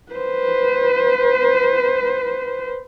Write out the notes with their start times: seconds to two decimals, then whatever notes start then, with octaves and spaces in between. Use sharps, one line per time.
0.12 B4 C5